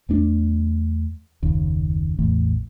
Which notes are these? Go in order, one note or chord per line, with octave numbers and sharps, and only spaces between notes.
E2 A3 D4
F#1 D#2 C#3
A1 E2 E3 A3